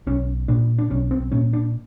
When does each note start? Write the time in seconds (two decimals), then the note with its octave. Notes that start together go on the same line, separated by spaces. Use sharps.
0.07 B1 C#4
0.48 A#2 D4
0.78 D4
0.90 B1 C#4
1.11 C4
1.32 A#2 C#4
1.53 D4